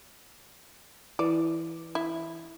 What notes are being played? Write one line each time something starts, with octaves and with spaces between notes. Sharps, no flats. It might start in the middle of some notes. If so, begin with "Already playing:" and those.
E3 D5
E4